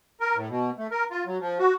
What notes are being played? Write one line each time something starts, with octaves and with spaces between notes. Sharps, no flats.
A#4
A2
B2
A3
A#4
F4
F#3
F3
F#4